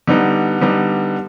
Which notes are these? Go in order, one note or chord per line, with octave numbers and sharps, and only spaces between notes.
D3 G3 B3 D#4
D3 G3 B3 D#4